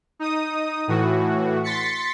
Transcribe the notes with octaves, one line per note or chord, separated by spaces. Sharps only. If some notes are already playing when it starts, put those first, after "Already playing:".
D#4 D#6
A2 E3 F#4
C6 A6 B6 C#7